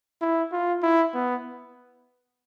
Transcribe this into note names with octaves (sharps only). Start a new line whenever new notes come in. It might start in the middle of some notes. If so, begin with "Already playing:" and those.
E4
F4
E4
B3